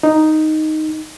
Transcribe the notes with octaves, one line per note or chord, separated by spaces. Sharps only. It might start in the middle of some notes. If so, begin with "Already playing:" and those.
D#4